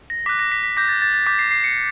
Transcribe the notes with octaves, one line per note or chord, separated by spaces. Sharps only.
A#6
D6 F#6 B6
A#6
B6
B6
D6 G6 A#6
A6
A6
A6
D6 G6 B6
C7
C7
C#7